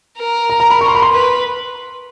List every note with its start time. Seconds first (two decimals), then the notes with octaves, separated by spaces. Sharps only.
0.19 A#4
0.50 A#5
0.60 A#5
0.71 B5
0.81 C#6
0.88 C6
0.95 B5
1.02 C6
1.12 B4